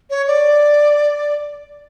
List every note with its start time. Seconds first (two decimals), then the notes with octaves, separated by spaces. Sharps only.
0.10 C#5
0.28 D5